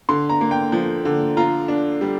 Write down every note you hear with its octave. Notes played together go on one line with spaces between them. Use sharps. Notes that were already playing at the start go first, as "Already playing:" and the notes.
D3 C6
A#5
A#3
G5
F3
D3
F4 A#5
D4
G3